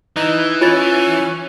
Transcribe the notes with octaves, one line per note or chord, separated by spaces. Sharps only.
E3 D#4
C#4 F4 A6